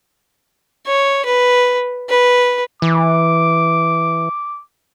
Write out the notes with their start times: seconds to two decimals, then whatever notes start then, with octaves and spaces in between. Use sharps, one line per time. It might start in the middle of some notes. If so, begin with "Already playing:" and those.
0.87 C#5
1.25 B4
2.09 B4
2.82 E3 D6